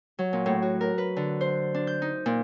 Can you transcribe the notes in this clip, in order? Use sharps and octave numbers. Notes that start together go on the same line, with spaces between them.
F#3
A#2
A2
F#4
A#4
B4
D3
C5
D4
G6
D#4
A#2